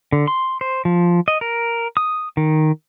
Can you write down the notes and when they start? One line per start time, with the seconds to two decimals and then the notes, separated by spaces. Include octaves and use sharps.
0.13 D3
0.27 C6
0.61 C5
0.85 F3
1.28 D#5
1.41 A#4
1.97 D#6
2.37 D#3